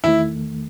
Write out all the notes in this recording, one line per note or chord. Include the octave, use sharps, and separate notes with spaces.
E2 D#3 A3 E4